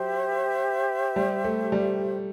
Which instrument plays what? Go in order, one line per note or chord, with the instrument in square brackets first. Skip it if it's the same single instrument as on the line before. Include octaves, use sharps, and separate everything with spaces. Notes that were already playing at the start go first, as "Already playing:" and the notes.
Already playing: [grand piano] F#3 [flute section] G4 C5 E5
[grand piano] G3
A3
G3